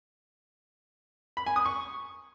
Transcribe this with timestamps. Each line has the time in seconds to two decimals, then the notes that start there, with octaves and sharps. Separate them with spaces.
1.37 B5
1.46 G#5
1.56 D#6
1.66 C#6